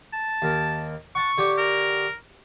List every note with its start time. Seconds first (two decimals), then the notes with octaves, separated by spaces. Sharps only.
0.13 A5
0.42 D#2 A#4
1.15 F#5 A5 C#6
1.38 D3 G4 C#5
1.58 A#4